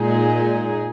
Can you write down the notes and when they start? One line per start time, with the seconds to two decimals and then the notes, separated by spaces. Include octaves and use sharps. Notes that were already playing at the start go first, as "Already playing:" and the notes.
Already playing: A#2 G#3 D#4 G#4